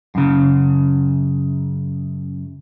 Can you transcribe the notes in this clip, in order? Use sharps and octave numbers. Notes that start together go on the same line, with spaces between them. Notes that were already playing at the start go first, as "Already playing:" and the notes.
F#2 C#3